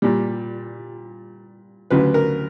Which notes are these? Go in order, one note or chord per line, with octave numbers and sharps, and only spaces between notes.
A#2 G3
D2 C#3 F#3 B4
A#4